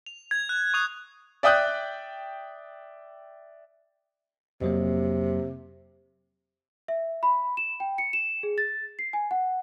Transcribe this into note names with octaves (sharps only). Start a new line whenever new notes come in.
F7
G#6
F#6
C#6 D#6 F7
D5 E5 G5 D#6 F#6 G6
F2 C3 F#3 A#3
E5
B5
E7
G5
C#7
E7
G#4
A6
C7
G#5
F#5